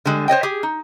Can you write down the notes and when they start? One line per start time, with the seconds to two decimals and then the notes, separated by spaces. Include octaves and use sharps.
0.05 D3 G3 G#3
0.28 C5 C#5 D#5 G5
0.43 G4 G#4
0.63 D#4